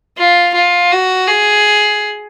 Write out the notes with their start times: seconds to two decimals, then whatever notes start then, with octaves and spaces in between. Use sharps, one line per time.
0.18 F4
0.54 F4
0.92 F#4
1.28 G#4